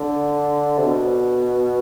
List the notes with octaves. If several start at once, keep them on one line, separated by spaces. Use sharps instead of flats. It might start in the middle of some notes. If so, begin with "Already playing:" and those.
Already playing: D3
C3
B2